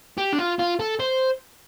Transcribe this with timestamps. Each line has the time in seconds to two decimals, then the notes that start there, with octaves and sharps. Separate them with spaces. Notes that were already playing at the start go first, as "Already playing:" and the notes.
0.18 G4
0.33 D4
0.39 F4
0.59 F4
0.80 A4
1.00 C5